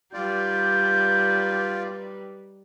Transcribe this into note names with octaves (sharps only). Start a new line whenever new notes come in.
G3 D#4 F4 B4 D5 G6